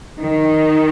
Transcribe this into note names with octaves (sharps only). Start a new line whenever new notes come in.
D#3